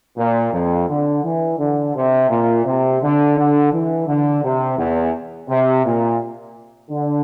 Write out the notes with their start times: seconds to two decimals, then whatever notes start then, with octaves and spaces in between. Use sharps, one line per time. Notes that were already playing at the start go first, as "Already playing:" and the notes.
0.17 A#2
0.53 F2
0.88 D3
1.24 E3
1.59 D3
1.95 C3
2.30 A#2
2.65 C3
3.02 D3
3.37 D3
3.73 E3
4.07 D3
4.44 C3
4.78 E2
5.49 C3
5.85 A#2
6.91 D3